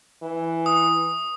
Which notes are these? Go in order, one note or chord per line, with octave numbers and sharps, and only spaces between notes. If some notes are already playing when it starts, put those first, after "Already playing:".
E3
D#6